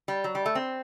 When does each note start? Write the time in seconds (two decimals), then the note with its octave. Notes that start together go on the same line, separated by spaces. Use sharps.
0.08 G3
0.24 F#3
0.35 G3
0.46 A3
0.55 C4